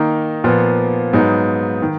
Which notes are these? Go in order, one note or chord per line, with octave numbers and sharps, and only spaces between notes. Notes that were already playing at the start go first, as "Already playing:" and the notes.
Already playing: D#3 A#3 D#4
A#2 F3 B3
G#2 F#3 B3 D#4
D#3